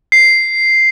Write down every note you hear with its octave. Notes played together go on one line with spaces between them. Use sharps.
C7